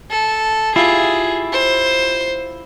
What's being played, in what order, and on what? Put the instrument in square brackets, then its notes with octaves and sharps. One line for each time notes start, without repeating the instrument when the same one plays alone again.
[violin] A4
[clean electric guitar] E4 F4 G4 [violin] G#4
[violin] C5